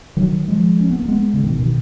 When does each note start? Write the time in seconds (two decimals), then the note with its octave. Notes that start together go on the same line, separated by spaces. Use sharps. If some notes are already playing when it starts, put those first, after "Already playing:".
0.17 D#3 F#3
0.48 F3 G#3
0.80 C#4
0.89 B3
0.99 A#3
1.08 G#3 B3
1.34 C#3
1.44 B2 D#3
1.59 B2 D#3